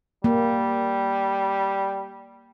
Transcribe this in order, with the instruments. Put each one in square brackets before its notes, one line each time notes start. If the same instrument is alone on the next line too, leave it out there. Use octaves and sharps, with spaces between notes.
[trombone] G3 [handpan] A#3